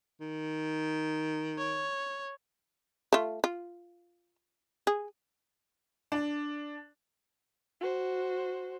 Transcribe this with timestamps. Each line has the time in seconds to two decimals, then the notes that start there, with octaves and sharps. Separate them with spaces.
0.21 D#3
1.58 C#5
3.13 A3 F4
3.44 F4
4.87 G#4
6.12 D4
7.81 F#4 C5